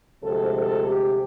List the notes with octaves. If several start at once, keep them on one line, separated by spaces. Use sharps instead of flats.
D2 C3 F3 G#3 A4
A4
G4